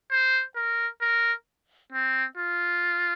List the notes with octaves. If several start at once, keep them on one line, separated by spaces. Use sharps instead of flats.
C5
A#4
A#4
C4
F4